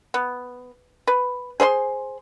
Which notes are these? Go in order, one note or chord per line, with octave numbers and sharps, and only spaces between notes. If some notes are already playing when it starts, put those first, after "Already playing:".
B3
B4
G#4 C5 E5 C6